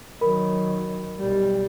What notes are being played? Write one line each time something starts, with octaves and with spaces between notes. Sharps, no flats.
D#3 F#3 A#4 B5
B1 G3